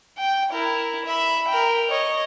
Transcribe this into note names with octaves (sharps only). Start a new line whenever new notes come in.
G5
E4 A#4
E5 B5
A#4 G5
C#5 D#5